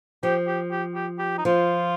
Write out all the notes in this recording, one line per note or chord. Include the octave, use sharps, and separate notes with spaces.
F3 G4
G4
G4
G4
G4
D#4
F3 F4